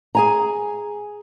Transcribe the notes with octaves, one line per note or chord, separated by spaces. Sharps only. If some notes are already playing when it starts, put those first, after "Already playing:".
G#4 G#5 A#5